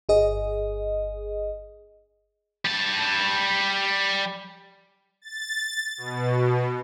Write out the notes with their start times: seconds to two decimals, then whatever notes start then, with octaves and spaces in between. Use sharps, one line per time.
0.09 G1 G#4 D#5
2.65 G3 A5
5.22 A6
5.97 B2